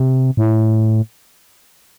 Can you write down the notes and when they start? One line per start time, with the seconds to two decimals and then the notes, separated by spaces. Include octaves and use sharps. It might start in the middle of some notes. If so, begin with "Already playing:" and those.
Already playing: C3
0.37 A2